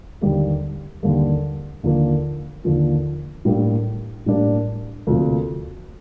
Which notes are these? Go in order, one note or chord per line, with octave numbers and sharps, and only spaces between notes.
D#2 D3 G3 A#3
D#2 D3 G3 A#3
D#2 D3 F3 A#3
D#2 D3 F3 A#3
A2 G3 A#3 D4
A2 G3 A#3 D4
D2 C3 F3 A#3